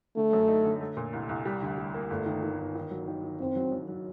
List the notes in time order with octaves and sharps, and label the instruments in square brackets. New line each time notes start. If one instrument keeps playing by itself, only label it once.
[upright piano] D3 [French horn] A3
[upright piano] F#2
D#4
D3
A3
A#2
C2
C2
G3
D2
G3
A#3
[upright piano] G1 [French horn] A3
[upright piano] D#3
D#3
G1
D#3
F#3
D#3
D#3
[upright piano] F#1 [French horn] C4
[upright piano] F#3
F#2
F#3